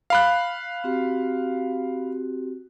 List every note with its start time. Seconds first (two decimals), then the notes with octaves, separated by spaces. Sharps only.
0.10 F5 B5 F#6
0.84 C4 F#4 G4